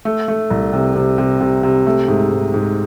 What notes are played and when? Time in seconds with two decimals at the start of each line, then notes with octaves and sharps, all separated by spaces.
0.05 A3
0.28 A3
0.51 C2
0.73 C3
0.95 C3
1.18 C3
1.40 C3
1.63 C3
1.86 A3
2.08 G#2
2.30 G#2
2.54 G#2